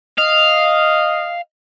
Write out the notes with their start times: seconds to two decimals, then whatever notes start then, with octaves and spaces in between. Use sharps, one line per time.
0.18 D#5 F5